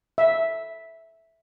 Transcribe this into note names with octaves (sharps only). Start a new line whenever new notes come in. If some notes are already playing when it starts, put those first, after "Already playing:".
E5